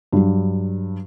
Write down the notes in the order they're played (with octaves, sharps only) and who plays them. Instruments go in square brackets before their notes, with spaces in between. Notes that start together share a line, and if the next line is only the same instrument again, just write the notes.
[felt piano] G2 F#3